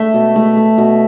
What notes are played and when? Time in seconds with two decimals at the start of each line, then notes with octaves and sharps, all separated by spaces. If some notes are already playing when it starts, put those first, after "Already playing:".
Already playing: A3 E5
0.14 B2
0.36 A3
0.57 A3
0.78 B2